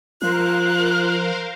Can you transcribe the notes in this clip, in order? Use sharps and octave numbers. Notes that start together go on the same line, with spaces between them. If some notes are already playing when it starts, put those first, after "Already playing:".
F3 F4 A#4 C5 F5 F#6